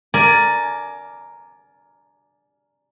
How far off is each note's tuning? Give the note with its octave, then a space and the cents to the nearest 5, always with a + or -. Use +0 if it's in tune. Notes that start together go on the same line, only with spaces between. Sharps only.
A#4 +0 D5 +0 G#5 +25